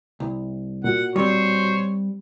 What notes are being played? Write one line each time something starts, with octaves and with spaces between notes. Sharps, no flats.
C2
A#2 F#4 F#5
G3 C4 C5 C#5